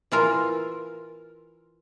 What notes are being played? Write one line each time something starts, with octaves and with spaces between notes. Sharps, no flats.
E3 F4 A#4